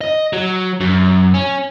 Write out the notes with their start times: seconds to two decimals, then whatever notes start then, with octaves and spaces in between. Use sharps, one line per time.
0.01 D#5
0.33 F#3
0.80 F#2
1.34 C#4